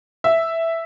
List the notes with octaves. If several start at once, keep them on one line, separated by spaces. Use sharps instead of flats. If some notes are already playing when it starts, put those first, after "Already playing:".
E5